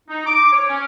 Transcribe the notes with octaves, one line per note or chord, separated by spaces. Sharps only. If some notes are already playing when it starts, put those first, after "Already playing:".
D#4
D6
C#5
C#4